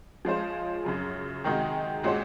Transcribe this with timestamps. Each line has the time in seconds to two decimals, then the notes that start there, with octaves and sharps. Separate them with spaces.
0.25 F3 G#3 C#4 F4 C5
0.85 F#2 C#3 F#3
1.44 C3 D#3 G#3 D#4 F#4
2.04 A#2 G#3 C#4 F#4 C5